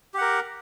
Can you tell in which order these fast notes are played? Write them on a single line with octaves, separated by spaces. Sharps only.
G4 F#5 A#4